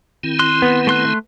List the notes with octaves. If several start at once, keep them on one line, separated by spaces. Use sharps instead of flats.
D#3 C4 E4
C6 F#6
B3
A3 C6 F#6